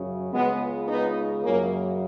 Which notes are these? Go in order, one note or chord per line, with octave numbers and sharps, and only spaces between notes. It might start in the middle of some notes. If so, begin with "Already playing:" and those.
Already playing: F#2 C#3
C#2 C#3 G#3 B3
B3 D#4
F#2 C#3 A#3 C#4